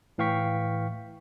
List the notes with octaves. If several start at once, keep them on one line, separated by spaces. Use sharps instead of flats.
A2 E3 F5 G5 C#6 B6